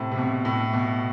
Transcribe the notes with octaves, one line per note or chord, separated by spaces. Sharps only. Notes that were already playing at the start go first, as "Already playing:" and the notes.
Already playing: A2 C3
C3
B2
A2
B2